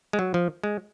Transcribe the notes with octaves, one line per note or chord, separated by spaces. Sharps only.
G#3
F#3
F3
G#3